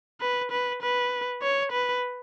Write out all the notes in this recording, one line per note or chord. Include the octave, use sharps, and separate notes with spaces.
B4
B4
B4
C#5
B4